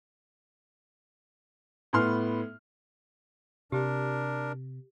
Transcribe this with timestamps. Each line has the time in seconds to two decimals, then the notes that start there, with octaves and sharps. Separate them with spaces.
1.93 A2 B3 C6 F6
3.72 C3 D4 G4 A#4